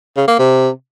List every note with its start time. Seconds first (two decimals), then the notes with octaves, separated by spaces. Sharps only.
0.17 C#3
0.28 A#3
0.39 C3